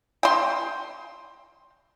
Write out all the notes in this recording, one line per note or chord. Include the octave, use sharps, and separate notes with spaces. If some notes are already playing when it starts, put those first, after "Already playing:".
G5 C6